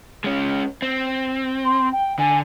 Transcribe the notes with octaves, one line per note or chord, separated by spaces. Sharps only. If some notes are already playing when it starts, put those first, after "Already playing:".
G#3 C#4
C4
C6
G5
D3 G#5